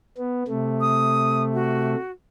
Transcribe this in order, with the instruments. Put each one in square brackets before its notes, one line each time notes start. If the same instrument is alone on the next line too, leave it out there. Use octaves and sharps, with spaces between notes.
[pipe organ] B3
C3 A3
[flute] D#6
F#4